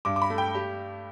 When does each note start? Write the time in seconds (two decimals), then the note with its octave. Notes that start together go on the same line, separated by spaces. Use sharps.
0.05 G2 D6
0.16 D6
0.22 B5
0.30 A3
0.38 G5
0.55 G4